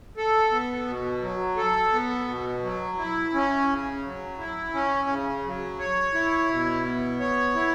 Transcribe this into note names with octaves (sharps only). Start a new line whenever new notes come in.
A4
B3
B2
F#3
A4
B3
B2
F#3
E4
C#4
C#3
F#3
E4
C#4
C#3
F#3
C#5
E4
B2
B3
C#5
E4